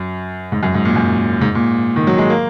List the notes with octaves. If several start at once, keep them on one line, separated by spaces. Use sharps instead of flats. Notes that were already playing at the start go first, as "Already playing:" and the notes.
Already playing: F#2
G#2
F#2
G#2
A#2
F#2
G#2
A#2
D#3
F#3
G#3
A#3